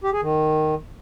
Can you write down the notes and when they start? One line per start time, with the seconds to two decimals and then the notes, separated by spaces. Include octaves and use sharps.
0.04 G4
0.13 G#4
0.22 D#3